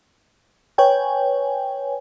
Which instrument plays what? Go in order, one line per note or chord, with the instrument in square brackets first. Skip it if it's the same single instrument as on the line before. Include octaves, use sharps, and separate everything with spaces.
[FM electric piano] B4 C#5 G5 G#5